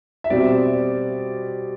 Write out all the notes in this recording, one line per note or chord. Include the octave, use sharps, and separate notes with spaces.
E5
B2 G3 C4 D5